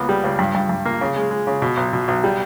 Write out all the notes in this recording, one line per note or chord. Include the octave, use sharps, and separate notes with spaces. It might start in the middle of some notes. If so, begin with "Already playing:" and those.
Already playing: C#2 A#3 B3
G3
C#2
G2
G2
G2
A#3
C#3
G#3
G#3
C#3
B2
B1
B2
B1
G3